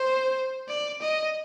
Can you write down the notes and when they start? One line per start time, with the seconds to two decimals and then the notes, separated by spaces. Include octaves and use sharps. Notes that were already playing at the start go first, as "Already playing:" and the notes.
Already playing: C5
0.69 D5
1.02 D#5